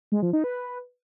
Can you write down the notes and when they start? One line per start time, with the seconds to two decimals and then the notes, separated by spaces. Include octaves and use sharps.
0.12 G#3
0.22 F3
0.33 D#4
0.44 B4